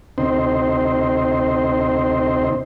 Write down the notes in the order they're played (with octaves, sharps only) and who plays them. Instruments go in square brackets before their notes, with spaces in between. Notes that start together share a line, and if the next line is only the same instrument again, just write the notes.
[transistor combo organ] D2 C3 C4 D#4 C5